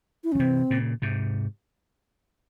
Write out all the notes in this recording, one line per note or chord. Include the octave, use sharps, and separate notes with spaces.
E4
C#4
F3
C3 E3 C4
A#2 C#3
G#2 C3